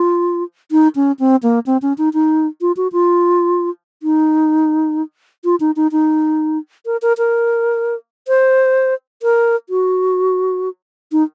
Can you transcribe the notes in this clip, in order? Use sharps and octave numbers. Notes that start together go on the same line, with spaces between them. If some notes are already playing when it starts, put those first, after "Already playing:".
Already playing: F4
D#4
C#4
C4
A#3
C4
C#4
D#4
D#4
F4
F#4
F4
D#4
F4
D#4
D#4
D#4
A#4
A#4
A#4
C5
A#4
F#4
D#4